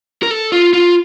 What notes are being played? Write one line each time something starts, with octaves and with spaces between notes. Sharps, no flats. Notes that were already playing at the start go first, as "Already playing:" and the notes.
A#4
A4
F4
F4